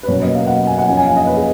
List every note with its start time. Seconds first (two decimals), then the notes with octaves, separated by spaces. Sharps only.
0.03 B4
0.07 B2 F#3 A#3 C#4 C#5
0.22 D#5
0.35 F5
0.47 F#5
0.67 G#5
0.78 F#5
0.87 F3 A#3 C#4 G#5
0.97 G#5
1.07 F5
1.17 D#5
1.27 B4
1.36 G#4